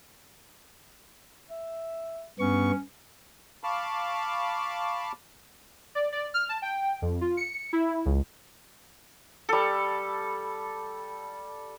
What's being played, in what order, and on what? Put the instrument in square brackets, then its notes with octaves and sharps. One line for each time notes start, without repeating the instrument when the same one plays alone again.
[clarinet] E5
[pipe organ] G2 B3 C#6 [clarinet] C#4
[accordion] F5 A5 B5 C#6 D6 F6
[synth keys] D5
D5
F6
A5
G5
F2
F4
C#7
E4
C#2
[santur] G3 A4